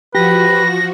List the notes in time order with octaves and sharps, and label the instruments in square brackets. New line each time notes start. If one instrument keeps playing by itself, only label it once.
[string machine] F3 F#4 [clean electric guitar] G4 [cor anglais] B4 [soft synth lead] A#6